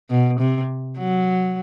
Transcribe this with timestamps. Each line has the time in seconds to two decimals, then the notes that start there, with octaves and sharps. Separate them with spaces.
0.10 B2
0.40 C3
0.98 F#3